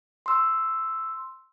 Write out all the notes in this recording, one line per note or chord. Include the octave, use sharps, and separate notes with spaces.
C6 E6